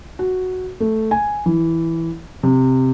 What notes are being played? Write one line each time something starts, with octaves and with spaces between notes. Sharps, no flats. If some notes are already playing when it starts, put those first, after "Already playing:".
F#4
A3
G#5
E3
C3